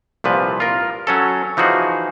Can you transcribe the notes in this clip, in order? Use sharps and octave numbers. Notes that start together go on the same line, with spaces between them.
C2 A#2 F3 B4
F4 A#4
F#3 C#4 A4
E3 F3 D#4 F#4 G#4